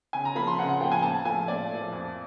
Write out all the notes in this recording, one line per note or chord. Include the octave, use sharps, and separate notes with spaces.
C#3 G#5
A#5
F3 A#3 B5
C6
C#3 F#5
F#5
F3 A#3 G5
G#5
A#2 A5
F3 A3 G#5
A#2 D5
A3
F3
F2